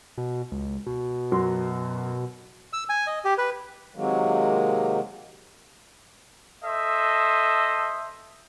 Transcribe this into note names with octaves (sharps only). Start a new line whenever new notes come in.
B2
C#2
B2
F#2 F#3 C6
E6
G#5
D#5
G4
B4
C3 D#3 F#3 G#3 A#3
A4 C5 D#5 E5